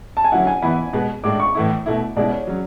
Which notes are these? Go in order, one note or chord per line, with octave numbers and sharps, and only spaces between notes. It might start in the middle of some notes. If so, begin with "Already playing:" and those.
A5
G#5
D3 F#3 C#4 E4 F#5
G#5
E3 B3 E4 B5
B2 G#3 B3
A2 G#3 D4 D6
C#6
A2 E3 A3 E4
B2 A3 E4
B2 G#3 C#4 E4 D5
C#5
C#3 F#3 C#4